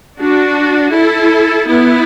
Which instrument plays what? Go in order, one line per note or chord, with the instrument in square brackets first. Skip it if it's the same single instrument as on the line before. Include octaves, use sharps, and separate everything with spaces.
[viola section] D4 F#4
E4 A4
B3 E4